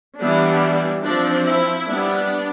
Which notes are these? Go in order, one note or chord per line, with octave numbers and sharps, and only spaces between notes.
E3 G3 B3 D4 E4
F3 C4 D4
E4
G3 B3 D4